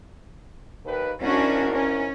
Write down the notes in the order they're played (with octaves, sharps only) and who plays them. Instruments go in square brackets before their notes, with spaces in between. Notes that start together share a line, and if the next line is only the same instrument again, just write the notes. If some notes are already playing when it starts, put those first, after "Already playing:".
[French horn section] D#2 A#4 B4
[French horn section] G#2 E4 A#4 [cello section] C#4 D4 F#4
[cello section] C#4